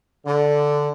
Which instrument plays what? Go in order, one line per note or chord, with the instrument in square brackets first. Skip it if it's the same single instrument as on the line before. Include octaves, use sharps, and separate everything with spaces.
[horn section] D3